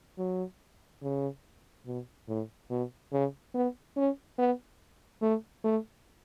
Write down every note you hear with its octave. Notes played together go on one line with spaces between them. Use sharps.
F#3
C#3
B2
A2
B2
C#3
B3
C#4
B3
A3
A3